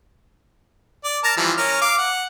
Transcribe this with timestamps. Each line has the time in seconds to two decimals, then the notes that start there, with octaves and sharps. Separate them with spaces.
1.04 D5
1.24 A#4 A5 A#5
1.37 E3 F3 G3
1.57 C#4 A#4 F6
1.81 F5 D6
1.98 F#5